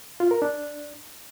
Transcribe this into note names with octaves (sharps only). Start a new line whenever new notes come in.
F4
A#4
D4